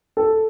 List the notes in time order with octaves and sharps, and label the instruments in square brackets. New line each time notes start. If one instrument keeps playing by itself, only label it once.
[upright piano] A4